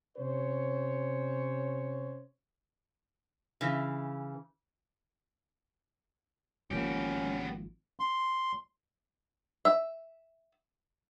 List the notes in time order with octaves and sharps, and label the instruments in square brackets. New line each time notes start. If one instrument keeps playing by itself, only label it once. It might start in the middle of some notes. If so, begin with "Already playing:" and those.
[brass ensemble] C3 C#4 C5 C#5
[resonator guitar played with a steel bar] C#3 E3
[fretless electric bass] G#1 F3 A#3 [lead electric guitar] B3 G4 [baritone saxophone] C#4
[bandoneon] C6
[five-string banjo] E5